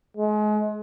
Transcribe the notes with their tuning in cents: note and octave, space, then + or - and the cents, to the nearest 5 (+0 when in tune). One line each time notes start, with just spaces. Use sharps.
G#3 +35